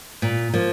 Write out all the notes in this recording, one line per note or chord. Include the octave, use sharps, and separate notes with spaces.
A#2
F3 A#3